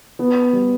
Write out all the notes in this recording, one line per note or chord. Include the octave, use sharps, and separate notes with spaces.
B3
G3